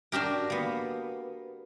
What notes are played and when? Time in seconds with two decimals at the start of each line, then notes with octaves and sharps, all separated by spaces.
0.12 D4 F#4 G4 A#4
0.50 A#3 B3